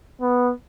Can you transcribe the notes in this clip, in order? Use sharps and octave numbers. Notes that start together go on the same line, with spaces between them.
B3